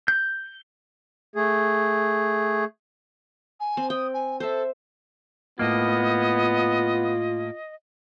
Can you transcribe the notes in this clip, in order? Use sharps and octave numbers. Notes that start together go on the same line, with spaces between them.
G6
A3 G#4
G#5
C4
G5 D#6
G#5
A4 C5 E5
A2 A#3 B3 F4 D#5